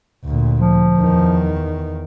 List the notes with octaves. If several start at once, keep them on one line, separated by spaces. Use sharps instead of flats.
D2 A#2
F3
E2 D#3